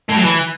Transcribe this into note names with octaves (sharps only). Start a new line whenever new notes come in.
A2
F#3
E3